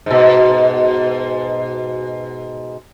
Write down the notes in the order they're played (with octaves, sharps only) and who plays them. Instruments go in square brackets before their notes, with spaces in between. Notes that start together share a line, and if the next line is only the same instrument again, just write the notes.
[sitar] G#2 B2